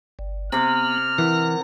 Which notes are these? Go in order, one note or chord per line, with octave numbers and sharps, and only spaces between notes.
G1
C3 B3 D6 F6
E3 A#4 F#5